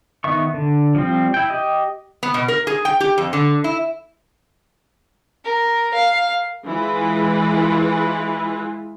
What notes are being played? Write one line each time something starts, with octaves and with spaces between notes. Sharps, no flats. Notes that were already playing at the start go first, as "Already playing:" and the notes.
D#3 B3 E5 C#6
D3
F3 G3 C4
E4 G5
G4 D#5
B3
B2
A#4
G#4
G5
G4
F2
D3
E4
A#4
F5
E3 G#3 F4 B4